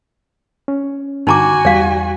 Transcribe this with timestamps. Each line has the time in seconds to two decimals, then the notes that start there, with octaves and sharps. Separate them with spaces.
0.68 C#4
1.27 G2 D3 D#4 F#4 G#5 A#5 D6
1.65 E2 G3 D5 F5